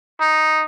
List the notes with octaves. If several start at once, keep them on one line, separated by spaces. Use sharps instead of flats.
D#4